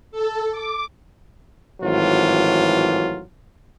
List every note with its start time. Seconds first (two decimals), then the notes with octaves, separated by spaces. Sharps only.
0.11 A4
0.51 D6
1.82 G#1 A2 E3 F#3 F4